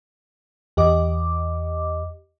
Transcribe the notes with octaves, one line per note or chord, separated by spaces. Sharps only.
E2 G4 D#5 D6